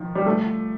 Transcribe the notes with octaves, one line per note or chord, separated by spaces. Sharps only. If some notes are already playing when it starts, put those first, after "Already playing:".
Already playing: D#3 F3
G3
A3